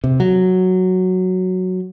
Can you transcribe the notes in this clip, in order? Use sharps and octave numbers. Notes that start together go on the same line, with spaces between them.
C3
F#3